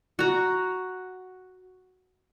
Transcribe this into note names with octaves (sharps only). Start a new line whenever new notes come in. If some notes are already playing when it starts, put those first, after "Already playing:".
F#4 A#5